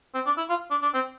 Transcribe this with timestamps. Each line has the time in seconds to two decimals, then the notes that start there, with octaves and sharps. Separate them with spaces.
0.15 C4
0.26 D4
0.38 E4
0.49 F4
0.71 D4
0.82 D4
0.94 C4